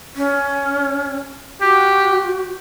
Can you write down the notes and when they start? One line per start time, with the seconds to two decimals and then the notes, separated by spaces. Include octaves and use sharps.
0.16 C#4
1.61 F#4 G4